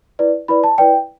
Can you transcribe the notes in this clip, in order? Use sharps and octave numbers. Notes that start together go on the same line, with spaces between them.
E4 B4 D5
E4 B4 D5 B5
A5
E4 B4 D5 G5